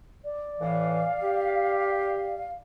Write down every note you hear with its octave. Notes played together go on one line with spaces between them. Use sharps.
D5
A2 E3 F5
G4